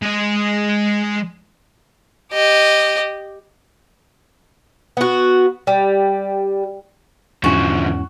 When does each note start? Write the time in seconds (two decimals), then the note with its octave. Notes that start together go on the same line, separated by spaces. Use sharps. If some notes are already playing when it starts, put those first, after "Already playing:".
0.02 G#3 D#5
2.33 G4 D#5
4.97 B3 F#4
5.67 G3
7.44 E2 G#2 D3 F3 C#4 F#4